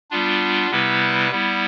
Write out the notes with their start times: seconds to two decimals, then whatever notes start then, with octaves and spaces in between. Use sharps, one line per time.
0.11 G3 B3 D4 F4
0.71 C3 G3 B3 E4 B4
1.31 G3 B3 E4